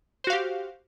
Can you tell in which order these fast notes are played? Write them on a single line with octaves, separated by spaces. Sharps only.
C5 F#4 F5 G4